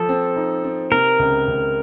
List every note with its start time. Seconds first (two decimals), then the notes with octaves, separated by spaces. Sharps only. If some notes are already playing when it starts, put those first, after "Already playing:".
Already playing: F3 A4
0.09 C4
0.36 D#4
0.64 C4
0.92 C3 A#4
1.19 C#2
1.48 C#2